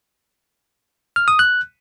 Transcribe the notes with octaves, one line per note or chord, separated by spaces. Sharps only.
F6
D#6
F#6